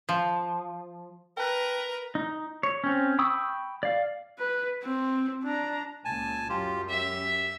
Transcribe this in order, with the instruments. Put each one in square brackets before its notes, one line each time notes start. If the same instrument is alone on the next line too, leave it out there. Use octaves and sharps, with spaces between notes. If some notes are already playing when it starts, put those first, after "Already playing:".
[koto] F3
[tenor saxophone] A#4 [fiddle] B4 A#5 [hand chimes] G5 A5 F#6
[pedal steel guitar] D#4
C#5
C4 C#4
G5 B5 C#6 D#6 E6
D5 F5
[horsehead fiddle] B4
C4
D4 A#5
[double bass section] C#2 A#2 [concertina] G#5 A5
[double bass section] F#2 [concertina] F4 G4
[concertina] G4 [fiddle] E5